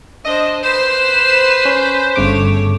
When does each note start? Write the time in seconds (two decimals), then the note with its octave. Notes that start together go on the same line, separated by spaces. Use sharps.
0.25 D4 C5 D#5
0.63 B4 C5 C7 E7
1.65 C#4
2.16 G1 C#3 A3 C#5 D6